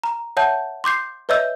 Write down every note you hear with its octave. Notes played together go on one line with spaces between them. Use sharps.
A#5
C#5 E5 F#5 A5 G6
C6 D6 G6 C7
B4 C#5 D#5 E5 E6 G6